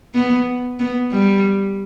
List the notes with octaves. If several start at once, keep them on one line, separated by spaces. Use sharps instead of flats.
B3
B3
G3